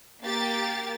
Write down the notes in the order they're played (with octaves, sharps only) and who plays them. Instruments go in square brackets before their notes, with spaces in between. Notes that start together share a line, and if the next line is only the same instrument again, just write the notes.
[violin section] A#3 G4 A6